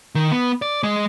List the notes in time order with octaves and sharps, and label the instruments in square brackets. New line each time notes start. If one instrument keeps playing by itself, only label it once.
[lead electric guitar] D#3
B3
D5
G#3